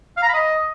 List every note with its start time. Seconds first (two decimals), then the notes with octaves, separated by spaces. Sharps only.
0.17 F5
0.23 A#5
0.28 B5
0.34 D#5